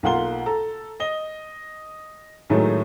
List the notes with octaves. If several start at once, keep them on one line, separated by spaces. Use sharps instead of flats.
B1 A#3 F4 F#5 C6 G7
A4 A#5
D#5 G7
A2 D#3 F#3 G#3 A3